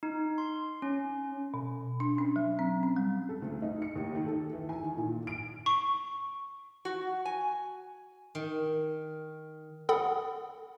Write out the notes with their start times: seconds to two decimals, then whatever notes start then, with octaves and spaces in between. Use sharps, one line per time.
0.03 D#4
0.38 C6
0.82 C#4
1.54 B2
2.00 D4
2.18 C#4
2.36 F#3
2.59 C4
2.83 C#4
2.96 G3
3.29 A4
3.42 D2
3.62 D#4
3.82 C#7
3.96 D#2
4.15 D#3
4.27 A4
4.53 E3
4.69 G#5
4.83 D#3
4.97 A#2
5.27 D7
5.66 C#6
6.85 F#4
7.25 G#5
8.35 D#3
9.89 A4 F#5 B5 D#6